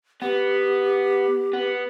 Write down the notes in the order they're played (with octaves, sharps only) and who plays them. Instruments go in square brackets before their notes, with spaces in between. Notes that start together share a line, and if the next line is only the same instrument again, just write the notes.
[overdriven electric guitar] B3 [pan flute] G4
[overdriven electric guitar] B3